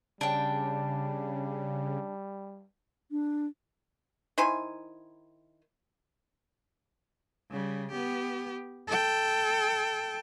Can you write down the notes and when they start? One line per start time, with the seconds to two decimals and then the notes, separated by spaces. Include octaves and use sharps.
0.21 C#3 G3 D4 G5
3.11 D4
4.38 D#3 E4 C5 G#5
7.51 C#3 G3
7.92 B3 G4
8.87 A4 G5